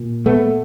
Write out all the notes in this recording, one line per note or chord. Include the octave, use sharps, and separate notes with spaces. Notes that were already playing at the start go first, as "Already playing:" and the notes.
Already playing: A#2
A3 B3